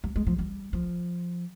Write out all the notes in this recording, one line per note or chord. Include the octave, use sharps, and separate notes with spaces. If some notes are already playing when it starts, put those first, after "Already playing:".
G3
G#3
F3
G3
F3